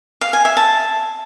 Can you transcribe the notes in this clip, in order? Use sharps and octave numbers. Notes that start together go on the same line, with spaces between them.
F5
G#5
E5
A5